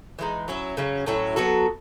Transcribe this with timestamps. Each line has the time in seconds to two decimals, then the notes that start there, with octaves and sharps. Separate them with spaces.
0.19 E3 G#3 D#4
0.48 F#3 C#4 E4
0.77 C#3 F#3 C#4
1.06 A2 F#3 C#4 E4
1.36 F#3 B3 F#4 A4